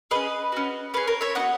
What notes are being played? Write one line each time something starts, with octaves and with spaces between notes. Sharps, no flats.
C#4 G#4 B4 D#5
C#4 F#4
C#4 G#4 B4
A#4 C#5
C#5 E5
B3 D#4 F#4 D#5 F#5